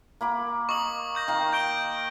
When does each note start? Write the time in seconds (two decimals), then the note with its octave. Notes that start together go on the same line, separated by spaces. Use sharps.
0.21 A#3 B5 D6
0.69 D#5 C#6 D#6 F#7
1.15 C#6 G6 A#6
1.28 D#3 F5 G5
1.53 G6 D7 G7